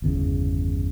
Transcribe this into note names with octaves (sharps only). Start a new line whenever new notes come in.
G1 E2 C#3